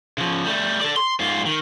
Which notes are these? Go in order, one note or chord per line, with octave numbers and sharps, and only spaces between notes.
C#3 F3
G3 A3
A4 D5
C6
G#2 F4
D#3